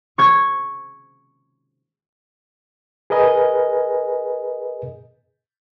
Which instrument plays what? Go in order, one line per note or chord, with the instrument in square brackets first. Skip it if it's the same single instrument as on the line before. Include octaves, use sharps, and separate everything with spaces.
[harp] C#6 G#6
[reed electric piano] G#4 A#4 B4 D#5 G#5